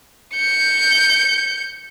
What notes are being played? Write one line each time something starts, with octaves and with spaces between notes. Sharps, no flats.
G6 C#7